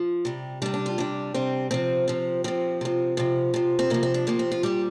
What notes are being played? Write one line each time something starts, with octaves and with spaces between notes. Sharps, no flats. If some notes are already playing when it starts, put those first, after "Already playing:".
Already playing: F3
C3 G3
C3 G3 D4
D4
F4
C3 G3 D4
C3 G3 C4
C3 F3 C4
C3 F3
C3 F3 C4
C3 F3
C3 F3
C3 F3
C4
C3 F3 A#3
C4
D4
C3 F3 A#3
C4
F4
A#2 G3 G4